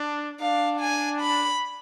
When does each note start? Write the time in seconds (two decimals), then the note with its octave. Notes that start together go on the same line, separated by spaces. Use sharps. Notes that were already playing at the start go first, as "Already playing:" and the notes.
Already playing: D4
0.40 D4 F5
0.80 G#5
1.21 B5